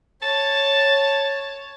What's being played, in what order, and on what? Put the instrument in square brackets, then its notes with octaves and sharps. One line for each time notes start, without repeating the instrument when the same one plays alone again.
[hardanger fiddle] C#5 [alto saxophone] A5